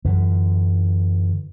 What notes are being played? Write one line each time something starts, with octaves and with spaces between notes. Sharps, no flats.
F#2 D3 E3